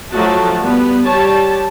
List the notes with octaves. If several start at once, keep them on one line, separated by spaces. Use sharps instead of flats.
F3 F#3 A3 F#4 A5
G3 B3
G3 G4 C#5 A5